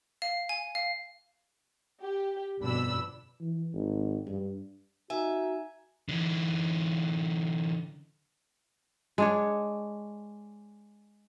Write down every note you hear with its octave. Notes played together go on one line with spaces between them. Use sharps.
F5
G#5
F5
G4
G1 F2 B2 D4 B5 E6
E3
G#1
G2
D#4 F#4 E5 G#5
D3 E3
G#3 D4 C#5